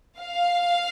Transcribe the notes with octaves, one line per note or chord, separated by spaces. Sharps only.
F5